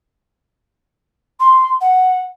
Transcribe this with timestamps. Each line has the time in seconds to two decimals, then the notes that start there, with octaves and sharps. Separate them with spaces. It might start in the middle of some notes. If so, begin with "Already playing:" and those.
1.40 C6
1.81 F#5